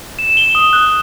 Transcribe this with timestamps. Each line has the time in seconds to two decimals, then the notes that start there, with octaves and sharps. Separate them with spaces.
0.19 E7
0.37 G7
0.55 D#6
0.73 F#6